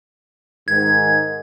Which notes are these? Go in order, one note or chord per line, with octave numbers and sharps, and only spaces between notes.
G#2 D#3 G#6